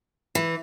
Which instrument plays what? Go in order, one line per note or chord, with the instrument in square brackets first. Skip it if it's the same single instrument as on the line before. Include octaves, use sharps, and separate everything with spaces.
[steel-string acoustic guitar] E3